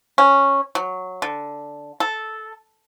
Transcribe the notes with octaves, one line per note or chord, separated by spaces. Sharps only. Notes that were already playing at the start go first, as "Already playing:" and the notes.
C#4
F#3
D3
A4